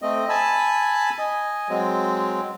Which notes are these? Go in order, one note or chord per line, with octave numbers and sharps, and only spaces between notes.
A3 C4 D#5
G#5 A5 B5 E6
D#5 G#5
F#3 G#3 C4